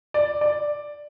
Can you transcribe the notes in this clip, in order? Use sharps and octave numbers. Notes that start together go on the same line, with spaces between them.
D5
D5